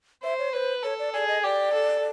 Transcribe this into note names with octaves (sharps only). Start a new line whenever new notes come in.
C5 E5
C#5
B4 C5 C#5
A4 C#5
D5
G#4 D5
D#5
G4 D5
A4